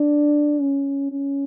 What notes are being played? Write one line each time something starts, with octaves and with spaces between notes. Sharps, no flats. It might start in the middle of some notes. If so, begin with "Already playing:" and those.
Already playing: D4
C#4
C#4